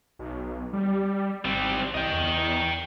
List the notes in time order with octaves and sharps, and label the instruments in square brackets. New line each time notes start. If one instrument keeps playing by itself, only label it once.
[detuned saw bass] B1
G3
[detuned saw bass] G#1 [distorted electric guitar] G3 C4
[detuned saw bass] C2 [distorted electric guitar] D#5 G5
[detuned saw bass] E2